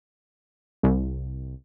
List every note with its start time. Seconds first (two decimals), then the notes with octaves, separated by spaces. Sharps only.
0.83 C2